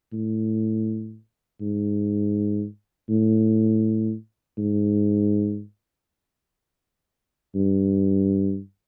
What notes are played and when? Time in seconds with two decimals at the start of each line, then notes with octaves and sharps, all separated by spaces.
0.13 A2
1.61 G#2
3.09 A2
4.58 G#2
7.55 G2